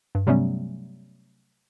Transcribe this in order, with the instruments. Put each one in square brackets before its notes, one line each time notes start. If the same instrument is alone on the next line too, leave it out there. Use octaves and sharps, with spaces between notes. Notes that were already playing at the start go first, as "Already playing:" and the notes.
[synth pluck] G2
C3 F#3 G3 A3 B3 C#4